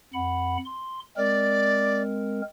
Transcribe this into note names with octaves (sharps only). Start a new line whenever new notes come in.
F2 F#5 B5
C6
G#3 C4 A#4 D5